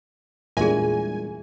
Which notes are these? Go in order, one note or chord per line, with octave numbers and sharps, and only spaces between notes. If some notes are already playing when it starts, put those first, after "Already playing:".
E2 A#2 G3 G#3 D4 G#4 E5 G#5